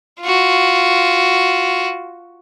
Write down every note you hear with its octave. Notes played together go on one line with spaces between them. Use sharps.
F4 F#4